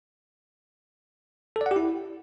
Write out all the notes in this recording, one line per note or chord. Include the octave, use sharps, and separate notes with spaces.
A4
D5
F#5
G4
E4